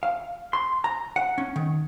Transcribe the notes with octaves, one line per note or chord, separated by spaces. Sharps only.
F5
C6
A#5
F#5
C#4
D#3